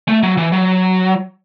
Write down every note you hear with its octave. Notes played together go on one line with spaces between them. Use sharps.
A3
F#3
E3
F#3